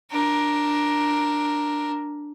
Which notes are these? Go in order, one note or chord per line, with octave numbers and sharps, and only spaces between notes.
D4 A#4